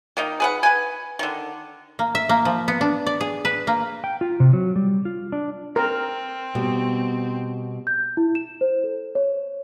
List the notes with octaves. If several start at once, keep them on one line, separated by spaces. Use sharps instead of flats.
D#3 A#3 D#4
G#4 B4 F#5
B4 G#5
D3 D#3
A#3
E5
A#3
F3
B3
D4
D5
G#4
B4
A#3
G5
F4
C3
F#3
G3
F4
D4
C4 A#4
B2 G3 B3
G6
E4
E7
C5
A4
C#5